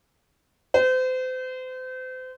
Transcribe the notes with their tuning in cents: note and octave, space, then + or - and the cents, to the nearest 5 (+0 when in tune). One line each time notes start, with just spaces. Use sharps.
C5 -35